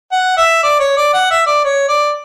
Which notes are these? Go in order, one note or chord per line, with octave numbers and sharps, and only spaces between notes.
F#5
E5
D5
C#5
D5
F#5
E5
D5
C#5
D5